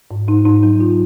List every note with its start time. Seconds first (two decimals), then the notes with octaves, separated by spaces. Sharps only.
0.11 G#2
0.28 G#2 D#4
0.45 G#2 D#4
0.63 F#3 D#4
0.80 F4